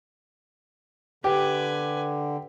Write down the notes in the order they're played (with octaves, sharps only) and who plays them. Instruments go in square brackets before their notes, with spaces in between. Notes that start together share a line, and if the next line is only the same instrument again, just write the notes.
[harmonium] D3 [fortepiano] G4 [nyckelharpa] B4 G#5